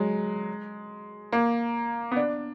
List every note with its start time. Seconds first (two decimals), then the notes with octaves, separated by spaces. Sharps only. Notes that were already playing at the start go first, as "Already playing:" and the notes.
Already playing: F#3 G#3
1.32 A#3
2.12 B3
2.16 D4